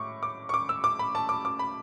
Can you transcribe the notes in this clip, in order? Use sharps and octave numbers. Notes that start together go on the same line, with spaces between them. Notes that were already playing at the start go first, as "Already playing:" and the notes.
Already playing: A2 C#6 D6
D6
C#6
D6
E6
D6
B5
A5
D6
D6
B5